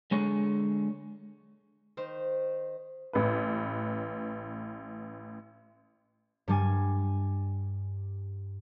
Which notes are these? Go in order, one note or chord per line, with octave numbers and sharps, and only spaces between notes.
D3 G#3 C#5
D#3 C5
A1 B4
G2 G3 G#5